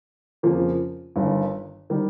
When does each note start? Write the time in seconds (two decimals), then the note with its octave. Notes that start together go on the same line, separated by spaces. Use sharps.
0.43 F2 C#3 F3 A#3
1.16 G1 G2 D#3
1.90 D#3 G3